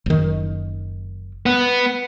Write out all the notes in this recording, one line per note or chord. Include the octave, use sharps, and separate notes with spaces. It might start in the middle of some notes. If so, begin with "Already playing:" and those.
F#1 D#3
B3